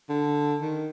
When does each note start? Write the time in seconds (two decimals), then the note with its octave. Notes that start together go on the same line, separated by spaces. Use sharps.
0.10 D3
0.62 D#3